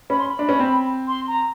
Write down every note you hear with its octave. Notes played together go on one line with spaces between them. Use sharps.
C#4 B5
C6
B5
D4
C#4
C4
C6
A#5